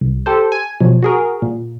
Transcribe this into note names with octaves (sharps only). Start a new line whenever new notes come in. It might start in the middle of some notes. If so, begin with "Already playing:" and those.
C2
G4 A4 C5
G#5
B2 F3 F#3
F#4 G#4 A#4
A#2